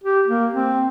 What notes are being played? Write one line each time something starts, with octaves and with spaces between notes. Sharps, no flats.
G4
A#3
C4